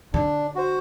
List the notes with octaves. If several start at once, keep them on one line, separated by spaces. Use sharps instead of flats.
D3 D4
F#4 C5